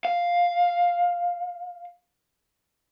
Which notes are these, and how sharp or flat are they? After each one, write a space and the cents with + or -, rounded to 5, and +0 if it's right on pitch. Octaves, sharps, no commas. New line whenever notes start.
F5 +5